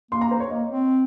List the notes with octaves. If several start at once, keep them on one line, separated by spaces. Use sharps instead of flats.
A#3 C6
A#5
C5
C#5
A#3 D#5
C4